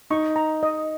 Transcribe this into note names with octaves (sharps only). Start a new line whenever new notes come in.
D#4 C#6
A#5
D#5